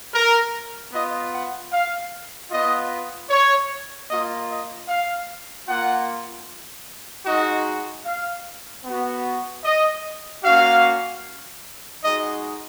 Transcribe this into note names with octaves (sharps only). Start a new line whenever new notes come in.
A#4
B3 F4 D#5
F#5
F5
B3 F4 D#5
C#5
A#3 F4 D#5
D#5
F5
A#3 F4 F#5
G#3 D#4 F#4 D#5
F5
B3 F#4
D#5
A#3 C#4 F#4 F5
G#3 D#4 F#4 D#5